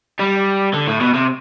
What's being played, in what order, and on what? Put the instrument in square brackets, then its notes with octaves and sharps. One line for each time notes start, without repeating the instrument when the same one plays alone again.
[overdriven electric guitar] G3
D3
A2
B2
C3